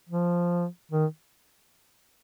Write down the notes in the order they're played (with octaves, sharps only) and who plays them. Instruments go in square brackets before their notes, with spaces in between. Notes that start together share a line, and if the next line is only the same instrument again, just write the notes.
[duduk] F3
D#3